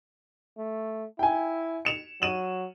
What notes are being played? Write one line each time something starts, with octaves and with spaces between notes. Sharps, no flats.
A3
E4 G5 G#5
C#7 E7 F7
F#3 D#7 E7 F#7